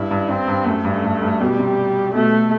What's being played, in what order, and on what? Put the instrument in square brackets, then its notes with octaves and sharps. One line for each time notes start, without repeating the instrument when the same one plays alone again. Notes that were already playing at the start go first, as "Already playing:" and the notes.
Already playing: [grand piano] G2 [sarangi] E4
[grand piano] G2
[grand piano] G2 [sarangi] C4
[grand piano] G2
[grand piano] F#2 [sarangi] A3
[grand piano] G2
G2
G2
[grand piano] B2 [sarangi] G3
[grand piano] C3
[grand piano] B2 [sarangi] A3